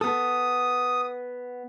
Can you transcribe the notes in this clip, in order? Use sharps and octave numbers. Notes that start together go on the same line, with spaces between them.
B3 A4 D#6